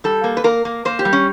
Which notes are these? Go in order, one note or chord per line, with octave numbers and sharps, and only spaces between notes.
G3 A4
A#3
B4
A#3 A#4
A#3
A#3 C5
G4
G3
C#4